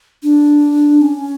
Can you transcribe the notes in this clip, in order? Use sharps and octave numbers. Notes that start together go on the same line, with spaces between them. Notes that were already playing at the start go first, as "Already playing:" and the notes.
D4
C#4